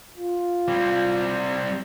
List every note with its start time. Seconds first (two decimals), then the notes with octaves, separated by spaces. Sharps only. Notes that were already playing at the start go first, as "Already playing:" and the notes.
0.17 F4
0.68 G3 C4